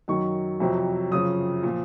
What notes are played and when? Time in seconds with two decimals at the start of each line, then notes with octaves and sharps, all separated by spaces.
0.08 F#2 D#3 F#3 C#6
0.60 F2 C3 F#3
1.11 F#2 C#3 F3 D#6
1.63 A#2 F3